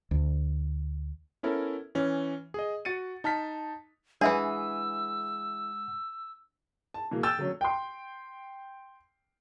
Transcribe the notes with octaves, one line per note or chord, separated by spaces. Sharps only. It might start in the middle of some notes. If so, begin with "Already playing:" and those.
D2
B3 C#4 E4 A4 A#4
E3 C#4
G#4 D#5
F#4 A6 C#7 D#7
D#4 A5 F6 B6
E3 G#3 D4 G#4 E5 F#5 E6
A5
B2 E3 A#3 G#4
G5 E6 F6 G6 A6 E7
D3 F#3 A3 C#4
G5 C6